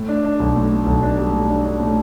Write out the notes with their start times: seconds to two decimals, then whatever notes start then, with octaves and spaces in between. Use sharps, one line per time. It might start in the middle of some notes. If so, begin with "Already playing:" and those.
Already playing: A2
0.08 D4
0.25 D4
0.40 B1
0.56 A2
0.72 A2
0.86 B1
1.03 D4
1.18 G3
1.33 A2
1.50 D4
1.65 D4
1.80 A2